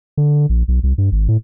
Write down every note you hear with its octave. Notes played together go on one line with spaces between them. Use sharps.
D3
A#1
B1
C2
G2
G#1
A2